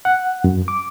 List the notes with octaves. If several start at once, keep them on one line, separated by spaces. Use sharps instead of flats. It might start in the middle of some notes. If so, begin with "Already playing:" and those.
F#5
F#2
D6